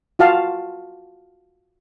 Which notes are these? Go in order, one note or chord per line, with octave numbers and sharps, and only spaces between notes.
F4 F#4 F5 A5